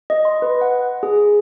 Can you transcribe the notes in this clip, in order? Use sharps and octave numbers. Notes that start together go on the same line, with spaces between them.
D#5
C6
B4
F#5
G#4